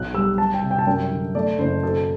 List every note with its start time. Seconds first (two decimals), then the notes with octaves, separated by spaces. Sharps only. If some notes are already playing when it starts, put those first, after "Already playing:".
Already playing: B1 F#6
0.14 G3 E6
0.38 G3 A5
0.54 G5
0.62 C3
0.71 G5
0.79 A5
0.87 F#2 G5
1.11 D3
1.35 A3 D5
1.59 F#1 C5
1.83 B2 A4